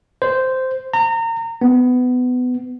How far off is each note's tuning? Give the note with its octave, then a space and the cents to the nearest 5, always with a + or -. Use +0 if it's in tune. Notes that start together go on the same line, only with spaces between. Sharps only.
C5 -10
A#5 -30
B3 +20